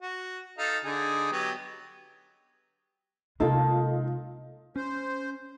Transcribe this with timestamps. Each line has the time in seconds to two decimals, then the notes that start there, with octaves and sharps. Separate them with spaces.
0.02 F#4
0.58 D#4 A4 F5
0.85 D3 D#4 G#4
1.32 F#3 B3 G4
3.40 C3 G#3 A#3 D#4 F4 A4
4.76 C#4 C5